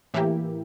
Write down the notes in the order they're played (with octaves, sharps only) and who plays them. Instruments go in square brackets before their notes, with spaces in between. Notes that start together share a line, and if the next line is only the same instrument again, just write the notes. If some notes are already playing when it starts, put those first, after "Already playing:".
[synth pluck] A2 E3 A#3 E4 G4